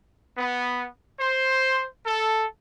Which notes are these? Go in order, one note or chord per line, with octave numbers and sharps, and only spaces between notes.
B3
C5
A4